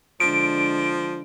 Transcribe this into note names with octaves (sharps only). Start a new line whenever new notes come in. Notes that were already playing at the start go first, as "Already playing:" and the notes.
D3 F3 G#3 D4 D7